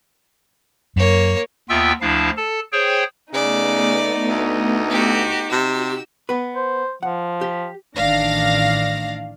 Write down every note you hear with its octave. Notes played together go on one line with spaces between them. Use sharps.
F#2 A#3 C#5
D#2 B3 F4 E5 G5 E6
D2 F3 D4 E4 F5 A5
A4 A5
G#4 C5 C#5 G5
C#3 A3 B3 D#4 D5
D2
F#4 G4
C3 F#4 G4 E6
B3 B4
C5
F3 F#5
G4
A1 D#3 D4 D5 F5 A#6